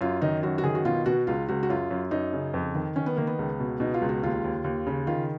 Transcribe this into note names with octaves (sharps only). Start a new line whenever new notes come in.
F#2 F4
D#3 D#4
F#2 F#4
F#4
D#3 G#4
F#4
B2 F4
B2 F#4
C#2 F4
C#2 F#4
F#4
F#2 F4
F#2
F#2 D#4
C#3
F2
D#3
D#3 C#4
B3
D#3 A#3
B3
C#2
B2
B2 D#4
F4
C#2
F#4
D#2 F4
D#2
D#2
C#3
D#3 F4